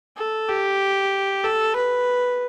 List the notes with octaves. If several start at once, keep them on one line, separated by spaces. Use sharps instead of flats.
A4
G4
A4
B4